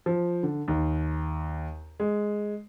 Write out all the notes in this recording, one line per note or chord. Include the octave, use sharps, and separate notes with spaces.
F3
D3
D#2
G#3